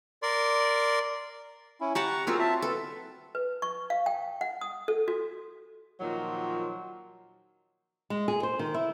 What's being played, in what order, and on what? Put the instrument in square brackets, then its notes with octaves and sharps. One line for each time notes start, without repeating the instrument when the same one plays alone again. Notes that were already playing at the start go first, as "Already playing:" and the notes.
[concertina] A#4 D5 C6
C#4 E4
[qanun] G4 F#5 A5 [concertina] A#5 C#6
[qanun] F#3 C4 F4 [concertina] G#4 A#4 E6
[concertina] E5 A5
[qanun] A4 [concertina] B4
[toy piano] B4
C#6
F5
G5
F#5
D#6
A4
F#4
[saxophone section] A#2 D#3 F3 F#3
[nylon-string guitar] G#3
G#4
C5
D#3
E4